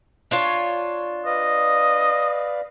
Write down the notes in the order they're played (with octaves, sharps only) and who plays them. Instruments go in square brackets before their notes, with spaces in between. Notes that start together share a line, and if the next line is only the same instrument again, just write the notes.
[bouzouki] D4 F4 C#5
[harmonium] B4 D5 F5 [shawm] D#5